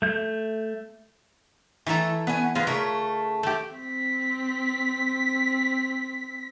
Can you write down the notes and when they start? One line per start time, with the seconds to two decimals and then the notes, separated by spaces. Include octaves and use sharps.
0.02 A3 G6
1.86 E3 A3 E4 A4 A#5
2.27 B3 C#4 G#5
2.55 G#3 F4 G#4 B4 F5
2.67 C#3 A3 A#4
3.43 A3 G4
3.77 C4 B6